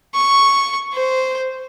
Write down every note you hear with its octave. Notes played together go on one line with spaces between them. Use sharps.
C#6
C5